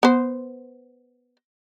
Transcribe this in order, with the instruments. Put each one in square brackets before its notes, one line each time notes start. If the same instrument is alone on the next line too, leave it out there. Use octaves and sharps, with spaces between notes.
[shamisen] B3 C5